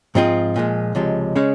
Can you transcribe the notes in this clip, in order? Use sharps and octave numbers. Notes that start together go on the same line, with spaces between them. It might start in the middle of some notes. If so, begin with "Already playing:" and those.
G#2 F3 C4 F4 G#4
A#2 F3 G#3
C#2 C3 F3 G#3
C#3 G#3 C#4